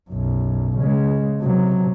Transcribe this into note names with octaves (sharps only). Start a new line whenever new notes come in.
B1 F#2
C#3 G#3
C3 F#3